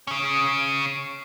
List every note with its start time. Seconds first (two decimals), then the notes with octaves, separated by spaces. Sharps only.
0.07 C#3 C#4